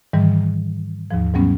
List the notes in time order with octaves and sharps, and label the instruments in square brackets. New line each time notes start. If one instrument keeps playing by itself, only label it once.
[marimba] G#2 D#3 E3 G3
D#2 G#2 F3
G#2 C3 F#3 G3 B3 C#4